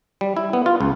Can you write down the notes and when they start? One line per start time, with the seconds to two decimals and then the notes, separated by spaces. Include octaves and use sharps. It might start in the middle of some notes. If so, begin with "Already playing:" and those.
0.21 G3
0.37 E4
0.53 B3
0.66 F4
0.81 C#2